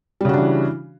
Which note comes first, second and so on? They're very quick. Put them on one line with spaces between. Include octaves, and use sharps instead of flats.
G3 C#3 F#4 D4 E3